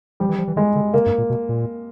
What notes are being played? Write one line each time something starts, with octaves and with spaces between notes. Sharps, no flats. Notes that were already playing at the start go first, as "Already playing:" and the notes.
F3 G3
E3
F3
E3
D#3 G#3
D3
C#3 A#3
G2
A#2
B2
A#2